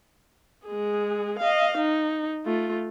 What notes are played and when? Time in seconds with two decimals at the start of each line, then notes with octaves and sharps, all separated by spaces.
0.66 G#3 G#4
1.39 D#5 F5
1.77 D#4
2.46 A3 F4